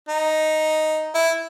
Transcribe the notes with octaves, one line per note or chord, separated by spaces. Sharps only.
D#4
E4